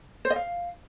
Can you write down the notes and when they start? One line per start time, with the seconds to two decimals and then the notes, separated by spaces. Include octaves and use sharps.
0.25 C5
0.30 D#5
0.36 F5